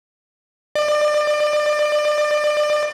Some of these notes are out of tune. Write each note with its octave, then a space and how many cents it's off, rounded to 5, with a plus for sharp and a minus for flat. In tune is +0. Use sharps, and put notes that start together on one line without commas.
D5 +30